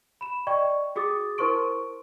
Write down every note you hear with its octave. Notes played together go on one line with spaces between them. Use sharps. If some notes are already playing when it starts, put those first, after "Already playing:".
B5 E7
D5 D#5 G5 C#6
F#4 G#4 D6 D#6 A6
E4 A#4 C5 C6 C#6 D7